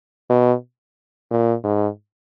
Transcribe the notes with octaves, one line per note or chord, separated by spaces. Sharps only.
B2
A#2
G#2